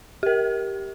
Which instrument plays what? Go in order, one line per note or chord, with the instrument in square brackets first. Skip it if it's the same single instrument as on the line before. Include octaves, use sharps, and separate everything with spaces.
[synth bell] G4 A#4